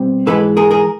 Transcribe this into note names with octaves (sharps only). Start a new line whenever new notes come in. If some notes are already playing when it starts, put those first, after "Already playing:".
Already playing: B2 G3 C4
G#2 E3 G#3 A4 B4
G#4 A#4
G#4 A#4